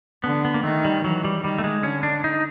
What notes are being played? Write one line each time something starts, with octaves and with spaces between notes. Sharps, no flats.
D3 B3
B3
A#3
D#3 A3
G3
E3 F#3
G3
D#3 G3
A3
G#3
D3 C#4
D4
D#4